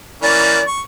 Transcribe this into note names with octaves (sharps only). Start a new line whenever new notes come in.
E3 A#3 C#4 D5
C#6